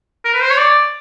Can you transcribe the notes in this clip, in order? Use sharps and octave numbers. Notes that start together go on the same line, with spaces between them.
A#4
B4
C5
C#5
D5